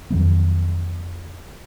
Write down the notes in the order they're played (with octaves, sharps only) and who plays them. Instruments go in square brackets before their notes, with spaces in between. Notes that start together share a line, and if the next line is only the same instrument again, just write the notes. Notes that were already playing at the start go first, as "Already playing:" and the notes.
[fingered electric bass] F2 D#3 F#3 B3